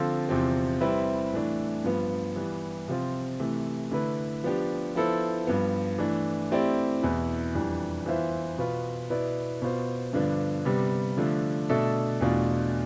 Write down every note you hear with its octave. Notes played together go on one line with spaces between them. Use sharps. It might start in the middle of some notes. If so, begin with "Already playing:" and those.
Already playing: D3 F3 C4 F4 A4
E2 C3 F3 C4
G3 C4 E4 B4 E5
A2 E3 A3 D4
G2 F3 B3
E3 G3 B3
C3 F3 C4 F4
C3 E3 A3
D3 A3 E4 B4
F3 B3 D4 G4
F3 B3 E4 A4 C5
G2 F3 B3
E3 A3 D4
A3 C4 E4 G4 D5
E2 B2 B3 E4 B4
F2 E3 G3 D4
E3 B3 F4 C5 E5
B2 B3 F4 B4
B2 B3 E4 B4 D5
B2 B3 F4 C5
G2 D3 F3 B3 D4
C3 G3 B3
D3 F3 A3 D4
B2 A3 D4 A4 E5
E2 B2 A3 D4 F4